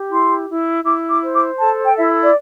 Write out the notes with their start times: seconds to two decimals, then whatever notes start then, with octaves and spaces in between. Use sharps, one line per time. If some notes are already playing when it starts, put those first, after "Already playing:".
Already playing: G4
0.10 E4 C6
0.48 E4
0.84 E4 D6
1.10 D6
1.22 C5
1.34 D6
1.60 A4 A5
1.85 G5
1.96 E4 E5
2.24 D5